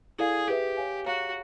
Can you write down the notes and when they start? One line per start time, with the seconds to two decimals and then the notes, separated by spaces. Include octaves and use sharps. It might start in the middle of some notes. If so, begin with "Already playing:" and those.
0.19 E4 G#4 A4 D5 F5
0.48 G4 G#4 B4 E5
0.77 C#5 F5 G#5
1.06 F#4 G#4 C#5 F5 A#5